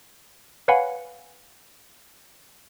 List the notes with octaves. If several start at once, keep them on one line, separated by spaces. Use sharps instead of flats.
B4 C#5 F5 F#5 G#5 B5